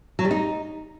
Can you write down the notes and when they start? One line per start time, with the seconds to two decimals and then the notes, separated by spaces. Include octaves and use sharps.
0.19 F#3
0.25 G3
0.31 D#4